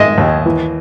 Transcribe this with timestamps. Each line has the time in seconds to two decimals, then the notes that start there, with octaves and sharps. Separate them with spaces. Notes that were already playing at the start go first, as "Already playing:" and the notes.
Already playing: D#3 G#3 D#5 E5
0.18 D#2
0.46 E3